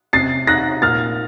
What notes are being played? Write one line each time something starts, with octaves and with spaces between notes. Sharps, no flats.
C3 A6 C7
D#4 F#6 A#6
A#2 F6 A6